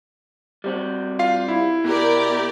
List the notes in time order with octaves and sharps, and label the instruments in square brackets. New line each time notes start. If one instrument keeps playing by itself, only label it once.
[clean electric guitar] G3 C4 F#4
[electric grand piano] F4 F5 C7
E4
[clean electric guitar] B2 [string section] G4 A#4 D5